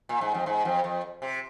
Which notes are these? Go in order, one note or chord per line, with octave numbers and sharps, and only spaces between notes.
A#2
G#2
F2
G#2
F2
F2
C3